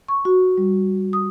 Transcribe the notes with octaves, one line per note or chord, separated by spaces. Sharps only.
C#6
F#4
G3
D#6